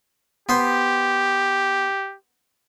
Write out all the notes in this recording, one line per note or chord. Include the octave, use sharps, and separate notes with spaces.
B3 G4 C5